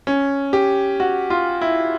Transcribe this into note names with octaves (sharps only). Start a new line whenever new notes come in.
C#4
G4
F#4
F4
E4